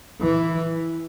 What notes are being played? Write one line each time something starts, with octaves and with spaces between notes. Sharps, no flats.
E3